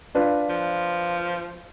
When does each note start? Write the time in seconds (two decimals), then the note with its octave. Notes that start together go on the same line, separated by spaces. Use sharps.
0.15 D4 F4 B4
0.50 F3